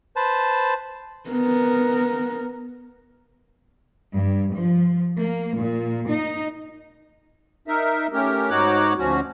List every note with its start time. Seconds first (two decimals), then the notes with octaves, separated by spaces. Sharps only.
0.16 B4 C5 A5
1.30 B3 A#4
4.14 G2
4.57 F3
5.18 A#3
5.58 A#2
6.08 D#4
7.68 D#4 A#4 E5
8.13 A3 C#4 G4 A#4
8.50 G#2 D#4 F#4 C#5 D6 F#6
8.97 D2 F3 C#4 F#4